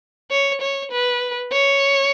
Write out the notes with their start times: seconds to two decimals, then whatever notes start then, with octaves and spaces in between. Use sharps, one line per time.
0.31 C#5
0.61 C#5
0.92 B4
1.52 C#5